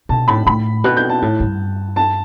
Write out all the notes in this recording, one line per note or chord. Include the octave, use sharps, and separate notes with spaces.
B2 A5
A2 B5
A2 B5
B2 F#6
G6
A5
A2
G2
A5